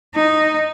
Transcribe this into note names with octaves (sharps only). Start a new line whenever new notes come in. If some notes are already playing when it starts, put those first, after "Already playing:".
D#4